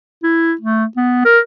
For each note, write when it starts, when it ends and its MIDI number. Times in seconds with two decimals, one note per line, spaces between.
0.23 0.53 64
0.61 0.85 57
0.97 1.24 59
1.25 1.40 70